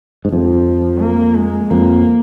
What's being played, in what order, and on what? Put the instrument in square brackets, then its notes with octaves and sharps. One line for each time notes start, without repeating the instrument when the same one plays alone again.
[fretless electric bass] G#2
[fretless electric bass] F2 [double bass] F3
[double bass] A#3
G#3
[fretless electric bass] F2 [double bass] A#3